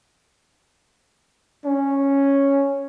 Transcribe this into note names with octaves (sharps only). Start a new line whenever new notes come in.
C#4